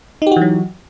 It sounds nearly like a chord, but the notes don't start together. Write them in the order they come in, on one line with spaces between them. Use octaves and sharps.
D#4 G4 F#4 E3 F#3